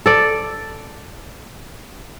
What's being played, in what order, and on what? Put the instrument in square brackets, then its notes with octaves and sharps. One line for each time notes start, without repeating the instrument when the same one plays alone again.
[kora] A4 D5